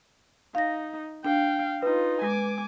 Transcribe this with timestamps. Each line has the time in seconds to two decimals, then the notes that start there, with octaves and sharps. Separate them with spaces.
0.55 D#4 F5 A#6
1.25 D4 F5 G5
1.83 D#4 F4 B4
2.22 G#3 G#5 D6